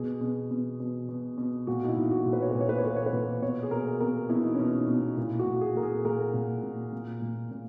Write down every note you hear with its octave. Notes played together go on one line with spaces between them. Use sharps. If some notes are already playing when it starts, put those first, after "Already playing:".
Already playing: B2 G#4
B2
B2
B2
B2
B2
A#2 F#4
D#4
E4
A#2
F#4
A#2
B4
C#5
A#2 B4
C#5
B4
C#5
A#2 B4
C#5
B4
A#2
B2 C#5
G#4
B2 A#4
B2 A#4
B2 E4
D#4
B2 C#4
D#4
B2
A#2 E4
F#4
A#2
G#4
A#2 A#4
G#4
A#2 A#4
A#2
A#2
A#2
A#2
A#2